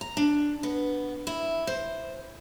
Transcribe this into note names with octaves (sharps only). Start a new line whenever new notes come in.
A#5
D4
B3
E4
C5